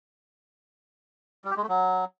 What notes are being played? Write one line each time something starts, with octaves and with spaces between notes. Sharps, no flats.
G3
G4
G#3
A3
F#3